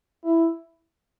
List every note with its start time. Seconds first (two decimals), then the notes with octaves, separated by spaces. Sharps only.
0.24 E4